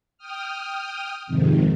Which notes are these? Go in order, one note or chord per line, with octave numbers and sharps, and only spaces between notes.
G5 D#6 F6
F2 G#2 C3 D#3